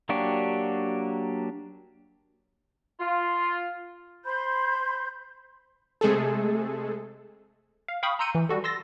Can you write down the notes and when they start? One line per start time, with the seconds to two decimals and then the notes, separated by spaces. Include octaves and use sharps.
0.09 F#3 A#3 D4 F#4 G4
3.00 F4
4.25 C5 B5 C6 G6
6.01 C3 G#3 A3 G#4 A4
7.88 F5
8.03 F5 G5 B5 C#6 D#6
8.19 A#5 C6 E6 G6 C#7 D#7
8.35 E3
8.49 G3 F#4 A4
8.64 C6 E6 A6 A#6